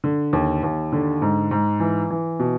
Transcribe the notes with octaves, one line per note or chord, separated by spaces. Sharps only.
D3
D#2
D#2
D3
G#2
G#2
E3
E3
B2